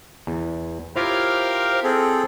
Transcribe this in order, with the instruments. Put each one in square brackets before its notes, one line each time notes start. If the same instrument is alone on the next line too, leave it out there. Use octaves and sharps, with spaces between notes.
[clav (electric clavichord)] E2
[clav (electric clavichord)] E4 F4 C#5 [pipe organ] G4 A#4 F5 [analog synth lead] C5
[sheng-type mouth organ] C4 G#4 A4